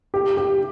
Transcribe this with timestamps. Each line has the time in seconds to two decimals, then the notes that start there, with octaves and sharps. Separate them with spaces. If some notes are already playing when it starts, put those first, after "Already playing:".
0.14 G4
0.37 G4